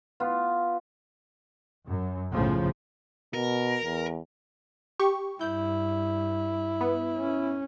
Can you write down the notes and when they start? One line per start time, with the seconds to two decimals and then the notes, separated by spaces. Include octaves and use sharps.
0.20 B3 F4
1.88 F#2
2.31 B1 A2 C#3 F3
3.34 B2 A#4
3.84 E2
5.00 G4 C#6
5.41 G2 E4 G6
6.81 B3
7.16 C#4